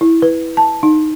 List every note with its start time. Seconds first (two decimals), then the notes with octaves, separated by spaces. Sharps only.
0.01 E4
0.22 B4
0.57 A5
0.83 D#4